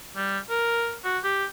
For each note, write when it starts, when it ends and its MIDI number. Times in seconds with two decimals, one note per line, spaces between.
0.17 0.39 55
0.50 0.96 70
1.04 1.19 66
1.24 1.46 67